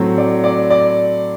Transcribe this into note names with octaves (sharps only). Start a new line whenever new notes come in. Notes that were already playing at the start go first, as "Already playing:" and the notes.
Already playing: A2 F#3 A3 C4
D5
D5
D5